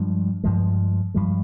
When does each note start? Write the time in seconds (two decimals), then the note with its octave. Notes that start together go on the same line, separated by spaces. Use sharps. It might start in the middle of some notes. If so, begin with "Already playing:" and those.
Already playing: G2 F3 G#3
0.44 G2 F3 G#3
1.14 G2 F3 G#3